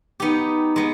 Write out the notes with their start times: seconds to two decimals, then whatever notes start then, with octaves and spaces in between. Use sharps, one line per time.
0.20 B3 D#4 G4
0.76 G#3 B3